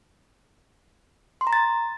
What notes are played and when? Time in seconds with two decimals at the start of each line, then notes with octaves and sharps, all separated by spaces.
1.41 C6
1.47 A#5
1.53 A6